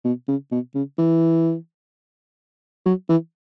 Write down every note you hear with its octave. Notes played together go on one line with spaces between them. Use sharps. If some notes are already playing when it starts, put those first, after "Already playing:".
B2
C#3
B2
C#3
E3
F#3
E3